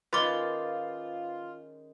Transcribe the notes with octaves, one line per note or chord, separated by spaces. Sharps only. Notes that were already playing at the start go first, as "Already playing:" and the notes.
D#3 G#3 C#4 F4 B4 C6 D6 A6